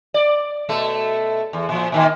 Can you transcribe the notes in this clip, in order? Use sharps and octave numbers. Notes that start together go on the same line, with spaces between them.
D5
B2 A3 A4
E2
A#2 F3
A#2 D#3 A#3